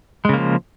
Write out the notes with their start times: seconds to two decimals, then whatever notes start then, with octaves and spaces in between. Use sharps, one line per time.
0.25 G#3
0.29 C#3
0.33 A#3
0.38 F3